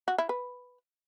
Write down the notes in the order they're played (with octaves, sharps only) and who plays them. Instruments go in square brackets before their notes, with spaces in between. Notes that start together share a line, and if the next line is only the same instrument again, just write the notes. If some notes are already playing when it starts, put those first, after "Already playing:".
[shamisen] F#4
E4
B4